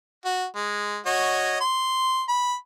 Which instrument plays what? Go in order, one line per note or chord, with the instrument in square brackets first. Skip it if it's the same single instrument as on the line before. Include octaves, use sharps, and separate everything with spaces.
[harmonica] F#4
G#3
F#4 C#5 D#5
C6
B5